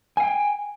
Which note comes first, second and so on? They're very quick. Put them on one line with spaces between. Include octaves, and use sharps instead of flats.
G#5 F5 G5